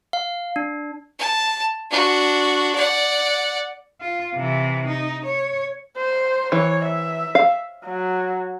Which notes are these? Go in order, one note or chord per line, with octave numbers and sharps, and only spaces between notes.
F5
D4
A5
D4 F#4
D5 F#5
F4
C3 E3
D#4
C#5
C5
E3 C#5
E5
F5
F#3